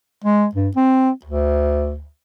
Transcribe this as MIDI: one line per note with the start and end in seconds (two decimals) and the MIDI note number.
0.24 0.46 56
0.55 0.69 43
0.76 1.10 60
1.25 2.06 38